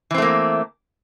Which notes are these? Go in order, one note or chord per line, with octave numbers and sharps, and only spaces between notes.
E3 A3 A#3 C4